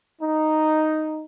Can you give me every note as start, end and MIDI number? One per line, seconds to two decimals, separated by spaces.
0.20 1.23 63